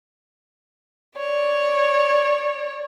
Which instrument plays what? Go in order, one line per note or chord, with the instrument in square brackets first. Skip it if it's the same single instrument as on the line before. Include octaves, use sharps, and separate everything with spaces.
[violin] C#5 D5